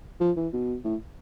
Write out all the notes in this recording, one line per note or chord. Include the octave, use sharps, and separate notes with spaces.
F3
E3
B2
A2